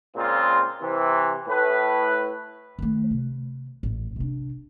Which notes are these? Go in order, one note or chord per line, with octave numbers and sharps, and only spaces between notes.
A#2 C#3 G#3 C4 F4
C3 E3
A2 B4
D#3 A3
C3
A1
C3 D4